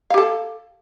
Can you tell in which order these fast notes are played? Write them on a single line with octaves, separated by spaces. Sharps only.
F5 G4 A4